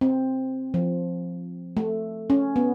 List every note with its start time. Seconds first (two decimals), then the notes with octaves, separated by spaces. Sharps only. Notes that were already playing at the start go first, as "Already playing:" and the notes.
0.01 C4
0.74 F3
1.77 A3
2.30 C#4
2.56 B3